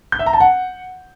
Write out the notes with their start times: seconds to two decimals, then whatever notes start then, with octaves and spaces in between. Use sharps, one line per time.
0.12 G6
0.19 E5
0.26 A#5
0.33 A5
0.40 F#5